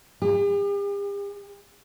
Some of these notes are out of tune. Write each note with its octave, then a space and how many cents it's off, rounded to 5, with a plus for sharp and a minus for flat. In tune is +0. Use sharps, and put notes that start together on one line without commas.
G4 +45